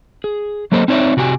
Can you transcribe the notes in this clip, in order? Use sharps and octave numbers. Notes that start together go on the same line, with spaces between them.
G#4
F#3 A#3 A4 C5 D#5
C4 D#4 C#5 D5 E5
C3 F#4 G4 G#5